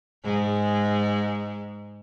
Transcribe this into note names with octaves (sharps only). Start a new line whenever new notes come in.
G#2 G#3